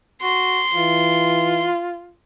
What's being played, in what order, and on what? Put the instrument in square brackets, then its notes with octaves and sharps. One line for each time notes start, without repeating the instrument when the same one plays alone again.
[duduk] F#4 [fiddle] C6
[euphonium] E3 [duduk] F4